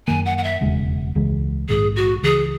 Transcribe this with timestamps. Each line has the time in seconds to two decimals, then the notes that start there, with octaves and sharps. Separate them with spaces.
0.07 F#2 D#3 A#3 G#5
0.25 F#5
0.37 F#5
0.44 E5
0.61 E1 D#2 C#3 G#3
1.15 C#2 C#3 E3 G#3
1.69 A#1 G#2 D#3 G#4
1.96 F#4
2.22 C#2 C#3 E3 G#4